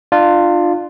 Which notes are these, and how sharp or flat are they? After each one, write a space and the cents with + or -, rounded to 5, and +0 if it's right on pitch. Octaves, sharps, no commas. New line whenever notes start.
D4 +35 F4 +0